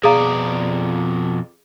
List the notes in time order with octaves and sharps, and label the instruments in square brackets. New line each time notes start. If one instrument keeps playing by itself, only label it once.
[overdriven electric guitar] F2 D5 [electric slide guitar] B2 [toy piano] G#4 F5 [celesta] A#5 D#6